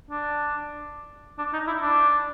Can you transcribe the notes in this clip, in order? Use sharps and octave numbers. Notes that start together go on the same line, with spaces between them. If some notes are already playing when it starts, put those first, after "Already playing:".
D4
D4
D#4
E4
D4